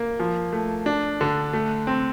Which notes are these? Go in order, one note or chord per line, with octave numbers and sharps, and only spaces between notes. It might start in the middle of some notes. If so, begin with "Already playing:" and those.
Already playing: A#3
F3
A3
D4
D3
A3
C4